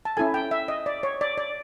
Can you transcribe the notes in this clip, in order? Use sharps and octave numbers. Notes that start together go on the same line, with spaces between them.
A5
C#4 E4 A4 G#5
G5
E5
D#5
D5
C#5
D5
D5